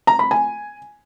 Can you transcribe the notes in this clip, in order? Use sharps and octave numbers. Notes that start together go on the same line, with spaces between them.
A#5
B5
G#5